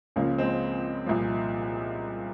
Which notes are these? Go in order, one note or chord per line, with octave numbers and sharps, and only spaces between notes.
C#2 C#3 F3 A#3
G#3 C4
C2 A#2 F3